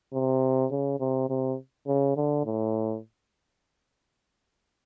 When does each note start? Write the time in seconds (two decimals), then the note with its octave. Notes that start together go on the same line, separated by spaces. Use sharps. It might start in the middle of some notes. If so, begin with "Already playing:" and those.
0.13 C3
0.71 C#3
1.00 C3
1.29 C3
1.87 C#3
2.16 D3
2.45 A2